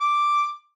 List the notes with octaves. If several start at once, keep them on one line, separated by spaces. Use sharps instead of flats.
D6